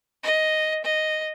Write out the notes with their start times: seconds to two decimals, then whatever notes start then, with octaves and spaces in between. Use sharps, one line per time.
0.23 D#5
0.84 D#5